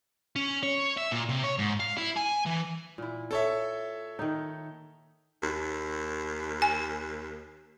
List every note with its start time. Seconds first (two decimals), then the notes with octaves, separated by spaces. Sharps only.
0.36 C#4
0.63 C#5
0.98 E5
1.12 A#2
1.29 C3
1.44 C#5
1.59 G#2
1.80 F5
1.98 E4
2.16 G#5
2.46 E3
2.98 A#2 E4
3.31 A4 C#5 E5
4.19 D#3 D#4
5.43 D#2
6.62 G#5